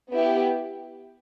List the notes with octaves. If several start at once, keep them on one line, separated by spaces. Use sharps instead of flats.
B3 E4 G4